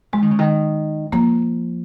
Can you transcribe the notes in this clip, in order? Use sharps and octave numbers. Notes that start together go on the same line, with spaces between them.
F3 G#3
D#3
C#3
D#3
F3 A#3